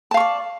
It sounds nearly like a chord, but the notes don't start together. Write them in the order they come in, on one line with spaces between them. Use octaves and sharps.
A5 F5 C#6 D5